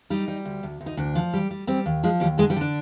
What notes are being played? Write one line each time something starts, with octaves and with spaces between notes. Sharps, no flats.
G3 D#4
G3
D2
D2
D2
D#4
D2 D4
F3
G3
G3
G3 C4
D#2
F3 G#3
D#2 G3
D3 G#3
G3
D3 D4